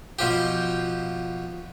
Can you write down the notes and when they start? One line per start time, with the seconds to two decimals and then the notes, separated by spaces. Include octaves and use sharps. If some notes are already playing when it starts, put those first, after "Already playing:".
0.19 B2 F3 G4